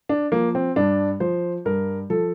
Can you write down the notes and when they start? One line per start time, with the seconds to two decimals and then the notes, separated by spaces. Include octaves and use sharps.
0.09 D4
0.32 F3 A#3
0.55 C4
0.76 G2 D4
1.20 F3 C5
1.65 G2 A#4
2.10 F3 A4